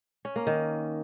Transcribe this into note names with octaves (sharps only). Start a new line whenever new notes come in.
C#4
A#3
D#3